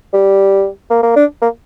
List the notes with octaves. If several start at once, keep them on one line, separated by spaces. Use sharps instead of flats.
G3
A#3
A#3
D4
A#3